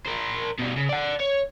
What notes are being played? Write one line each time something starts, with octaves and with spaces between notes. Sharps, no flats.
A#4 C5
B2 G3
C#3
D5 F#5
C#5